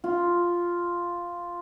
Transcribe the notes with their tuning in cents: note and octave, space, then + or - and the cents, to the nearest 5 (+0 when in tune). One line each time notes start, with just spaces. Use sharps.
F4 +0